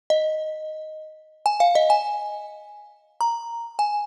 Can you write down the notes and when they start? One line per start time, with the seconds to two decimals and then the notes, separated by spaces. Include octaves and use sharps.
0.10 D#5
1.46 G#5
1.60 F5
1.75 D#5
1.90 G#5
3.21 A#5
3.79 G#5